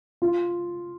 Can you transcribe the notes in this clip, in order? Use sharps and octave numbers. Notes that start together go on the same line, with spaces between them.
F4